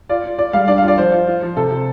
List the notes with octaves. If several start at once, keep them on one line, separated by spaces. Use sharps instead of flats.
F4 D5
F4
F4 D5
G3 F5
D4 D5
F5
F4
D5
F3 C5
F4
F4
F3
C3 A4
C3